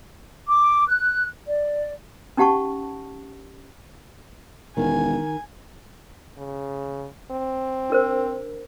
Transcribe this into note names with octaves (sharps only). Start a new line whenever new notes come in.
D6
F#6
D5
C#4 D#4 G4 F#5 A5 C#6
E1 D#3 G#5
C#3
C4
D4 A#4 C5